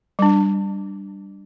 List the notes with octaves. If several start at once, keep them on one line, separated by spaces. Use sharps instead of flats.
G3 D4